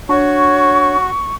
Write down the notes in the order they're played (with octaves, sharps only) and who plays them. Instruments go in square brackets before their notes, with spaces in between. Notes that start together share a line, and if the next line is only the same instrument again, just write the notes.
[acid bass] D4 [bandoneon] F#4 [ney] C#5 [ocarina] C#6